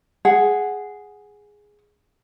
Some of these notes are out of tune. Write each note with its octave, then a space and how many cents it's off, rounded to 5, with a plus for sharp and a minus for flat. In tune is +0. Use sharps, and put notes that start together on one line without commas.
G#4 +0 F#5 +0